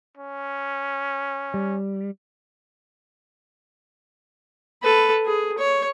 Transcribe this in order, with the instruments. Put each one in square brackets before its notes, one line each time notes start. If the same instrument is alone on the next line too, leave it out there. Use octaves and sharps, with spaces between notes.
[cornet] C#4
[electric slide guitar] G3
[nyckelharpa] A4 B4
G#4
C#5